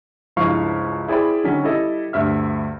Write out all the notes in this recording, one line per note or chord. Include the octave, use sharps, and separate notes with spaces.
C#2 G2 F3 E4 F5 C#6
E4 G#4 C5 D5 G5 B5
D3 D#3 F#3 C#4 B6
G3 E4 A4 D#5
D2 G2 E5 F6